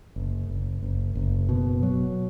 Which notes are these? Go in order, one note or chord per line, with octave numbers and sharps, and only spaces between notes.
F#1
F#1
F#1
F#1
B2
F#3